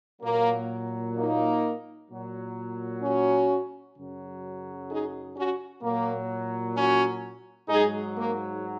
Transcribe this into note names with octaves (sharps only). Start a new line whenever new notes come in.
A#2 F#3 A#3
A#3 D#4
A#2 F#3
C#4 F#4
F#2 C#3 F#3
D#4 G#4
C#4 F#4
A#2 F#3 A#3
C#4 F#4
G#2 F#3 D#4 G#4
A#3